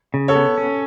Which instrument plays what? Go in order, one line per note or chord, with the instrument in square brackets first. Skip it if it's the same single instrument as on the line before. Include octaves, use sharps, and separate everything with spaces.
[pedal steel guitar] C#3
[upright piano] A4 C#5
[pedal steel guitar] B3
C#4